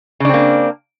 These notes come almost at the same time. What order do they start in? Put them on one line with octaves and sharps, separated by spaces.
C#3 D4 C4 A#3